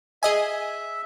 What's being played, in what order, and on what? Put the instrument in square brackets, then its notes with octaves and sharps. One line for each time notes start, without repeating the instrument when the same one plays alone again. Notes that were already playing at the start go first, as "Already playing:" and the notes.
[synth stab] G#4 D#5 G#5 [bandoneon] E5